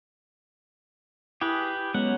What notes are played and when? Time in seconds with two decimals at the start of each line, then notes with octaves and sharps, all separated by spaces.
1.41 E4 G4 G#4 B4
1.94 F#3 G#3 B3 C#4 F#5